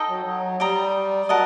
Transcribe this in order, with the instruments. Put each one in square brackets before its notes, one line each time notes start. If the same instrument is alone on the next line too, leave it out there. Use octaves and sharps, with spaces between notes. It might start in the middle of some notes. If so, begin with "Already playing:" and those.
Already playing: [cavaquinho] D#4 A4 D#5 G5
[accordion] F#3
F#3
[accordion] G3 [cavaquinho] D5 G5 A#5 D#6
[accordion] F#3 [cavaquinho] A#4 D#5 F#5 A5